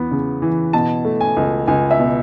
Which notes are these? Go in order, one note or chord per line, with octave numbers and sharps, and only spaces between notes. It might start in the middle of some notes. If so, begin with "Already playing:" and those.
Already playing: E2 B3
C#3
E3
B2 A5
A3
G#5
C#2
C#2 G#5
E5
B2